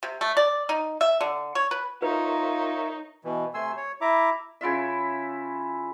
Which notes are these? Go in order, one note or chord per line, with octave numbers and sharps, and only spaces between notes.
C3
A3
D5
D#4
E5
D3
C#5
B4
D#4 F4 A#4 B4 C#5 E5
B2 E3
C3 A3 G#5 C6 E6
C#5
E4 E5 A#5 D6
C#3 E4 F4 E5